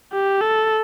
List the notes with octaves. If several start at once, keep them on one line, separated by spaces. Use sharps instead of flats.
G4
A4